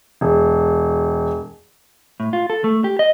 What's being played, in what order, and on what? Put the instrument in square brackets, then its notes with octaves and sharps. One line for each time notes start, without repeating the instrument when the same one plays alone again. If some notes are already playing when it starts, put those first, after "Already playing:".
[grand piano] E1
[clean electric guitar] A2
F4
A4
A3
G4
D#5